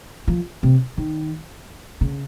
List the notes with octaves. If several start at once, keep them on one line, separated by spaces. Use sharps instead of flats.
F3
C3
D#3
C#3